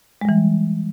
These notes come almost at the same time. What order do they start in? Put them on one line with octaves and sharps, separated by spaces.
G#3 G3 E3